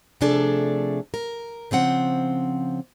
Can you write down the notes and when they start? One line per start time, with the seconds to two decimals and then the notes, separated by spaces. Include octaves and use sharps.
0.21 C3 F3 A3 D4 G#4 A4
1.14 A#4
1.71 C#3 F3 C4 F#5